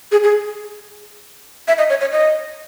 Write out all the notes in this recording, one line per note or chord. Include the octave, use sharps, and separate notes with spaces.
G#4
G#4
E5
D#5
C#5
C#5
D#5